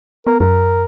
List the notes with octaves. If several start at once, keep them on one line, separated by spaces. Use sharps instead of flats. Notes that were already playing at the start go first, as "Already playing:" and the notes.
B3 A#4
F#2 A#4